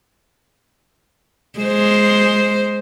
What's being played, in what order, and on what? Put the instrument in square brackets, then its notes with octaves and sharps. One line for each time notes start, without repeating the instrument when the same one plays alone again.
[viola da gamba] G#3 C5